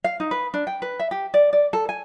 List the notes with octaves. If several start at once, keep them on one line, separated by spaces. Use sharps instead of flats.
F5
D#4
B4
D4
G5
B4
E5
G4
D5
D5
A4
G#5